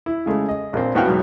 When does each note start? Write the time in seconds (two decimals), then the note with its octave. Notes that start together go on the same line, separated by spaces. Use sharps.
0.06 E4
0.26 C#3 G#3 A3
0.49 D#5
0.73 A#1 A#2 C4
0.95 A2 B3 F#4 F5 G5 F6
1.07 G#1 F#2 B2